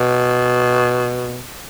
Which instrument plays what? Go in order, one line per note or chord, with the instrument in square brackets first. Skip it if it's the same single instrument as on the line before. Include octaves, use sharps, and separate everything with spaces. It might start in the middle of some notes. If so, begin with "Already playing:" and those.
Already playing: [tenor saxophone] B2